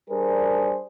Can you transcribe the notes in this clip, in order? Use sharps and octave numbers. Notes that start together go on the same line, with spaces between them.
G3 D4 G#4 A#4 C5